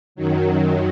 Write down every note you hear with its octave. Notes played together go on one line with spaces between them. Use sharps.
F#2 D#3 F#3